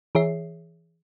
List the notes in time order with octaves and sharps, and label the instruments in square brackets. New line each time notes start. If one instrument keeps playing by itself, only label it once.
[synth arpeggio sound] E3 G#4 C#5 E5 C7